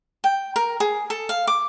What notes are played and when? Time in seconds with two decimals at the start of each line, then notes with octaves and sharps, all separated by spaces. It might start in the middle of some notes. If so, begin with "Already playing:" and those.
0.24 G5
0.56 A#4
0.80 G#4
1.10 A4
1.29 F5
1.47 D6